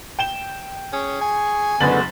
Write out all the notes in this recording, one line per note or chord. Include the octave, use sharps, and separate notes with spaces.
G5 E7 G7
C#4 G#4 C#6
G#5
F#1 D3 G#3 B3 F#4 A6 F#7